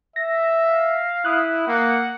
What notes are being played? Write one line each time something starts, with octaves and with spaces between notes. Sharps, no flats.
E5 A#6
F5
E4 D#6 F#6
A#3 F#5